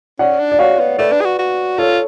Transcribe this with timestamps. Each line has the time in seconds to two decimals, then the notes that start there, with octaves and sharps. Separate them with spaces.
0.19 C#4 D5 F#5
0.39 D4
0.52 D5
0.59 F#4 C#5 F5
0.80 B3
0.99 A3 B4 D5
1.12 D4
1.21 G#4
1.25 F#4
1.39 F#4
1.78 F4 A4 C#5